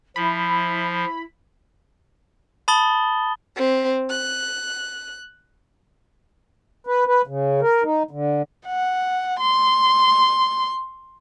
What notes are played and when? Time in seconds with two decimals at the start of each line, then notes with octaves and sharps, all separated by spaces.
0.16 F3 E4 B5
2.68 A5 B5 D#6 A6 G7
3.55 C4
4.09 F#6
6.87 B4
7.07 B4
7.27 C#3
7.61 A#4
7.83 D#4
8.11 D3
8.67 F#5
9.39 C6